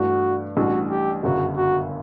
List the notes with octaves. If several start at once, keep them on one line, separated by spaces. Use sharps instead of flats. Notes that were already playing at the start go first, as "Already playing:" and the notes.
Already playing: G2 E3 A3 D4 F#4
A1 A2 E3 G3 D4 F#4
G4
G1 F#2 C#3 F#4
F#4